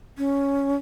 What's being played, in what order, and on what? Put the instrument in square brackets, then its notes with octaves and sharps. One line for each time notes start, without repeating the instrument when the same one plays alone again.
[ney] C#4